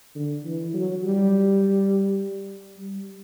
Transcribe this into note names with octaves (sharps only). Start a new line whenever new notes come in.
D3
E3
F#3
G3
G3